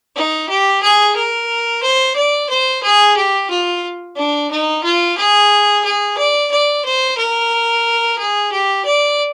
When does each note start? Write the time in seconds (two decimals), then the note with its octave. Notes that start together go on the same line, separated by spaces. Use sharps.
0.16 D#4
0.49 G4
0.82 G#4
1.16 A#4
1.83 C5
2.16 D5
2.50 C5
2.83 G#4
3.17 G4
3.50 F4
4.16 D4
4.51 D#4
4.83 F4
5.18 G#4
5.84 G#4
6.18 D5
6.51 D5
6.85 C5
7.18 A#4
8.18 G#4
8.52 G4
8.85 D5